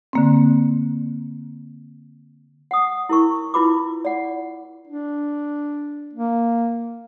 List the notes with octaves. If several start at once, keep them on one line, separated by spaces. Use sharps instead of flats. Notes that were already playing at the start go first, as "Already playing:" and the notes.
D3 A#3 C4
F#5 D#6
E4 A#4 C#6
E4 F4 B4 B5 D6
D5 F#5
D4
A#3